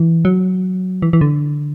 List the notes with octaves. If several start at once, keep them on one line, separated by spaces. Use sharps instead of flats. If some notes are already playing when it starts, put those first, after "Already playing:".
Already playing: E3
F#3
E3
E3
D3